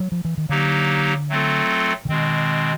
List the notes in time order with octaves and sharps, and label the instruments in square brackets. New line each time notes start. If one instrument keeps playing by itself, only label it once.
[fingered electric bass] F#3
F3
E3
D#3
[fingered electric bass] D3 [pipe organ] F#3 A#3 D#4 G4
[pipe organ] F#3 A3 C4 F4 A4
[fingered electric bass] D3
[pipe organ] B2 G#3 C4 [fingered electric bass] D#3